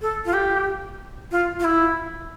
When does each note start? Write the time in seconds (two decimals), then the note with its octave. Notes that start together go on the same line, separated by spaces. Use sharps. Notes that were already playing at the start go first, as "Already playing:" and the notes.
0.02 A4
0.25 F4
0.33 G4
1.31 F4
1.60 F4
1.64 E4